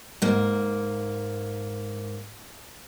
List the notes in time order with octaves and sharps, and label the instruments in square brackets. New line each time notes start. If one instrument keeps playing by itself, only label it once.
[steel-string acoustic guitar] G#2 A#3